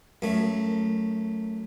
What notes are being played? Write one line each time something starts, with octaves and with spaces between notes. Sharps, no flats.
F#2 A3